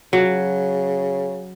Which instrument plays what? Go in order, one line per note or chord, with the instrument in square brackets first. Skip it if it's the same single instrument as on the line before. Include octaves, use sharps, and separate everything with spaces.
[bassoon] C#3 [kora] F#3